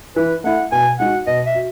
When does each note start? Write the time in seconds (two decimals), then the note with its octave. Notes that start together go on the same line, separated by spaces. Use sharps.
0.16 E3 B4
0.44 A3 E4 F#5
0.72 B2 G#5
0.99 G#3 D#4 F#4 F#5
1.27 B2 D#5
1.46 E5
1.55 F#4